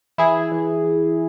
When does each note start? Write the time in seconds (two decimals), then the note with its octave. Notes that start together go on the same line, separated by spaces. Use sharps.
0.18 E3 E4 G#4
0.52 E3
0.84 E3